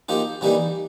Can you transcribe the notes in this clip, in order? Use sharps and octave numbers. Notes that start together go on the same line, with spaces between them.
F3 A#3 D#4 G4
C3 E3 G3 A#3 D#4